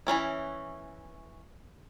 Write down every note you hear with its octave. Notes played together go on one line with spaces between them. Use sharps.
E3 F#3 C#4 E4